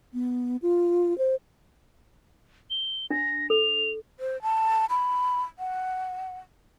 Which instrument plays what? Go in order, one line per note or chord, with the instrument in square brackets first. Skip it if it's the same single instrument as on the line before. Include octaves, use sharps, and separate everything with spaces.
[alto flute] B3
F4
C5
[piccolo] G7
[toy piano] D4 [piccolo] A#6
[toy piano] A4 [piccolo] F7
[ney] C5
A5
B5
F#5